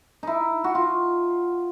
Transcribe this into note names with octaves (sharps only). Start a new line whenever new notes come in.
D#4 E4
F#4
F4